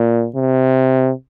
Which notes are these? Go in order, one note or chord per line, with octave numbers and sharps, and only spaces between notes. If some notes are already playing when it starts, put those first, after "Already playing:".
Already playing: A#2
C3